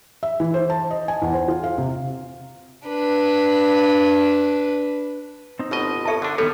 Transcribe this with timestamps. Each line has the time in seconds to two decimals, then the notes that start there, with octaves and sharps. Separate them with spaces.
0.23 E5
0.40 E3
0.54 C5
0.70 A5
0.91 D#5
1.08 G#5
1.22 E2
1.33 C5
1.48 F4
1.64 F5
1.78 C3
2.87 D4 B4
5.59 C4 D#4
5.71 G1 B2 D#5
6.05 A4 A#4 C#5 E5 A5
6.22 D3 D4
6.38 D#3 G3 B3 A4 B4 C#5